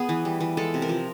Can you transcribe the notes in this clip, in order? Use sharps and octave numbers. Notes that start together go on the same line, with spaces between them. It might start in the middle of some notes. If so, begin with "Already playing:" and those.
Already playing: B3 G#4
E3
G3
E3
G#3 A4
C3
A#4
F3